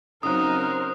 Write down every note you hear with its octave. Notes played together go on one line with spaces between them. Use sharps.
C#3 F#3 C4 D#4 A#4 C5 D#6 F#6